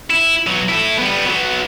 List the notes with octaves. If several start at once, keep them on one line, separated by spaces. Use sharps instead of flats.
E4
B2 F#3
E4 A4
G3 B3
F#3 B3